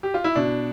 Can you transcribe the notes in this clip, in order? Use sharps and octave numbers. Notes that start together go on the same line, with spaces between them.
G4
F4
E4
B2 D4